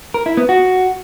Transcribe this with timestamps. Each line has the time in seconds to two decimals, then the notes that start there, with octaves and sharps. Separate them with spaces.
0.14 A#4
0.26 E4
0.37 B3
0.49 F#4